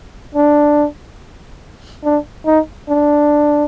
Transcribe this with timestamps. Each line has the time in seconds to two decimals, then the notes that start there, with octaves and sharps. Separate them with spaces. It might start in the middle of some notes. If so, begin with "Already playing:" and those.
0.35 D4
2.04 D4
2.46 D#4
2.89 D4